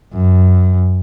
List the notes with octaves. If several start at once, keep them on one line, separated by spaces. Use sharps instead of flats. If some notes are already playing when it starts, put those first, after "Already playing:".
F#2